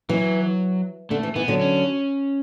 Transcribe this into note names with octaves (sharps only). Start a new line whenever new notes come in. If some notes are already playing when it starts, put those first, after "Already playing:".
E3 F#3
D3 A3
E3
E3 B3
D3 F#3
C#4